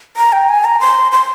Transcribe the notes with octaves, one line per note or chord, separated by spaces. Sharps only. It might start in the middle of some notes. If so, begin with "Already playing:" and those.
A#5
G5
G#5
A#5
C6
C6